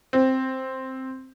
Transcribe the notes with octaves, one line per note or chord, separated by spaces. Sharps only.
C4